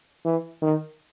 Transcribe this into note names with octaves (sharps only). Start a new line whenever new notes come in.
E3
D#3